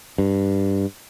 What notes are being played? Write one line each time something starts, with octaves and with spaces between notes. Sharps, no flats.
G2